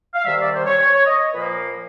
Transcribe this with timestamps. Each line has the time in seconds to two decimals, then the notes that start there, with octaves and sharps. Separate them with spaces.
0.15 F5
0.25 C3 D#3 G3 E5
0.40 D5
0.53 C5
0.66 C#5
0.80 C#5
0.93 C#5
1.06 D#5
1.33 A#2 F3 A#3 B4